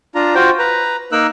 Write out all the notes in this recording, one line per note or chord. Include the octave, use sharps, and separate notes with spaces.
D4 F4 A#5
F4 F#4 C5 G5
B4 A#5
A#3 D#4 A#4 E6 F#6